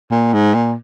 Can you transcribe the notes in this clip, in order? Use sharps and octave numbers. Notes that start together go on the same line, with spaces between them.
A#2
G#2
A#2